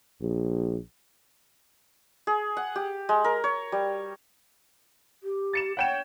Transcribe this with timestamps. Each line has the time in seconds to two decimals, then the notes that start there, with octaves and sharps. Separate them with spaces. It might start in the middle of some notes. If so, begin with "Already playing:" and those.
0.21 A#1
2.27 G#4
2.57 F#5
2.76 G4
3.09 G#3
3.24 A#4
3.44 C#5
3.72 G3
5.23 G4
5.53 A6 C#7 E7
5.77 C#5 F#5 G5 E7